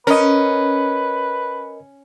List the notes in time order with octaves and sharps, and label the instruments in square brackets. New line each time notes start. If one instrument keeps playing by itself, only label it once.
[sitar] C#4 [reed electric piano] A#4 D#5 [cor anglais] B4